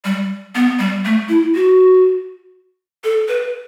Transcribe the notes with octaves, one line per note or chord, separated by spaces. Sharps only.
G3
B3
G3
A3
E4
F#4
A4
B4